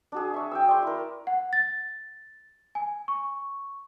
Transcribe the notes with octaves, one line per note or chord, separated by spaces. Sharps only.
D4 F#4 G#4
E5 C#6
G5 G#5 E6
D5 G#5 C6
E4 A#4
F#5
A6
G#5
C#6